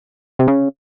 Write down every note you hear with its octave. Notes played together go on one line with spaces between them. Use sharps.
C3
C#3